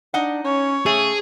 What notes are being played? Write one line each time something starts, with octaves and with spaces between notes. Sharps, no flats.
D4 D#4 F#5
C#4 C#5
C#3 A3 G#4